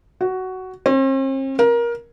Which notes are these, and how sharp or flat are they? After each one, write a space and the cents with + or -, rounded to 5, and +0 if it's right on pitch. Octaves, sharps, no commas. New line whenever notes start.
F#4 +10
C4 +45
A#4 +20